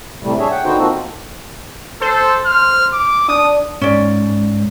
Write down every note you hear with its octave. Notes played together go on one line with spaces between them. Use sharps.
A2 C3 G3 A3
D4 G#4 C#5 E5
F#5 G5
D3 B3 D#4 F#4 C5 G5
A#3 C4 D#4 F4 F#4 A4
A4 C5
F6
D6
D4 D#6
G#2 C#4 D5